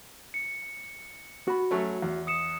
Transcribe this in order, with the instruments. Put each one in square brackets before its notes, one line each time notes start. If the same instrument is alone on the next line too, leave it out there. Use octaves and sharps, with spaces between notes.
[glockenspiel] C#7
[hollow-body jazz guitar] F#4 B5
[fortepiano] F#3 A3 C#4
E2
[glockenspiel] D#6 C#7 E7